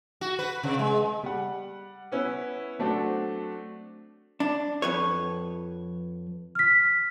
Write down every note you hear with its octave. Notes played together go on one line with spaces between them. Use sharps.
F#4
B4
C3
G#3
G3 F#5
B3 C#4 E4 B4
F#3 A3 C4 D4 F#4
D4
F2 B4 C#5
F6 B6